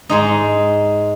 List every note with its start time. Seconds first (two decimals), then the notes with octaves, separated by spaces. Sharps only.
0.09 G#2 G#3 D#4